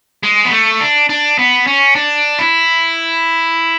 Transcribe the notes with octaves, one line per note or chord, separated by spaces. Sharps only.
G#3
B3
A3
D4
D4
B3
C#4
D4
E4